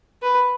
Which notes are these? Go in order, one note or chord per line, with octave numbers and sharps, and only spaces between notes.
B4